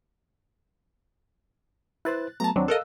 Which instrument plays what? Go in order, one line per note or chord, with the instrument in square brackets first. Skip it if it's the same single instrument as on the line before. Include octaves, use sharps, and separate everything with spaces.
[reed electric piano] E4 B4 C5 [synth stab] F#6 A6
[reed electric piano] F#3 A3 B3 [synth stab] A5 A#5
[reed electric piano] D#2 C4 D4 [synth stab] F#3
[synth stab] A4 A#4 D#5 [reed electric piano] F5 E6 F#6